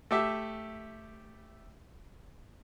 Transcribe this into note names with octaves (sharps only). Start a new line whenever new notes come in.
A3 G4 E5